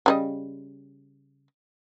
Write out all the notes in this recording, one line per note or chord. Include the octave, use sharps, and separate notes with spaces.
C#3 G3 D#5